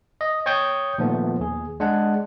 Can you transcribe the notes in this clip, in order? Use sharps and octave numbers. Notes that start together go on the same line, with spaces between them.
D#5
C#5 G5 C#6 D#6 G6
A#2 D#3 F3 A3 B3
D#2 G#4
G#3 D4 F#5